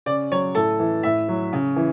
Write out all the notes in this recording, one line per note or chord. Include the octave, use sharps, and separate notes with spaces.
C#3 D5
F#3 C#5
A2 A4
E3
A2 E5
F#3
C#3
E3